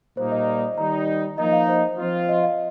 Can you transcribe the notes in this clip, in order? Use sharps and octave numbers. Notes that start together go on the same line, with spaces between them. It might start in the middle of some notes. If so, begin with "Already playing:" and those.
A#2 G3 A#3 D#4 C5
D#5
D#3 G3 D#4 A#5
F3 A#3 D#4 D#5
F5
C5
F3 C4 F4
D#5
F5